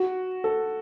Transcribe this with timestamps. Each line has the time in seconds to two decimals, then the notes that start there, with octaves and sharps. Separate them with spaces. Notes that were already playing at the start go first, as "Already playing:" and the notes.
Already playing: F#4
0.44 A4